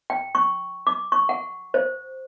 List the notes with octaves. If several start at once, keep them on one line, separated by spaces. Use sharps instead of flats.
G5
C#6
D6
C#6
F#5
C5